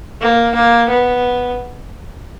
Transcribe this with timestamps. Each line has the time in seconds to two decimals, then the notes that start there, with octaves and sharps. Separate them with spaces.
0.21 A#3
0.55 A#3
0.89 B3